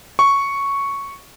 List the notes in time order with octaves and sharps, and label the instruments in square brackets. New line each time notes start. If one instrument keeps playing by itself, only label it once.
[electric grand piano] C#6